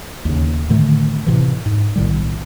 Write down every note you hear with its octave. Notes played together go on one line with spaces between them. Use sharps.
D#2 C#3
A2 D3 D#3 A3
A2 C3 E3
G#2
B1 A2 D#3 G3